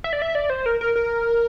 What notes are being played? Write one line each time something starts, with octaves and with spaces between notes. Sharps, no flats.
E5
D5
E5
D5
C5
A#4
A#4
A#4